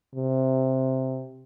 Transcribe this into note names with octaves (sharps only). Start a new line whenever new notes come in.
C3